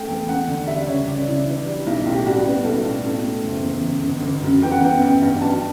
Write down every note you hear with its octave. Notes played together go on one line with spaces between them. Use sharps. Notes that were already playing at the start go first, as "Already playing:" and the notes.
Already playing: A3 G5
E2
E2 F#5
D3
G3 E5
C#2 C#5
C#2 D5
D4
C#3 E4
E3 D4
G3
B1 E4
A2
G4
G3 F#4
B3
B1 A4
A2
B2
A3
F#1
E2
C#3
G1
G1
F#2
E3 G5
F#5
B3 G5
A1 G5
G2
F#3 A5